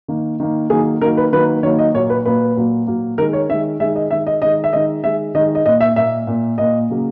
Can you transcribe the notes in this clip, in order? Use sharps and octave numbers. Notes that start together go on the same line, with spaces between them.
D#3 A#3
D#3 A#3
D#3 F#3 A#3 G#4
D#3 F#3 A#3 A#4
B4
D#3 F#3 A#3 B4
D#3 F#3 A#3 C#5
D#5
A#2 F#3 A#3 C#5
B4
A#2 F#3 A#3 B4
A#2 F#3 A#3
A#2 F#3 A#3
D#3 G#3 A#4
C#5
D#3 G#3 E5
D#3 G#3 E5
D#5
D#3 G#3 E5
D#5
D#3 G#3 D#5
E5
D#3 G#3 D#5
D#3 G#3 E5
D#3 G#3 D#5
D#5
A#2 A#3 D#5
E5
A#2 A#3 E5
A#2 A#3
A#2 A#3 D#5
C#3 F#3 A#3